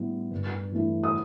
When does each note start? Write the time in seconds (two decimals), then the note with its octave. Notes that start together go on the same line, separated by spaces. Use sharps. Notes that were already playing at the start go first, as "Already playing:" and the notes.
Already playing: A2 G3 B3 E4
0.31 G2
0.72 E3 A3 E4
1.03 D#6